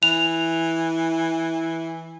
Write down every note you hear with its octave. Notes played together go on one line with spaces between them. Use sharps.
E3 F7